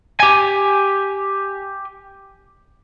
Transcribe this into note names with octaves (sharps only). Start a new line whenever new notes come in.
G4 G#5